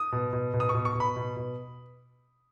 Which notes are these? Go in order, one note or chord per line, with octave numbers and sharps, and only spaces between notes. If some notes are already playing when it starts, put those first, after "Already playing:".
Already playing: D#6
B2
B2
B2
D#6
C#6
B2
C#6
B2
B5
B2
B2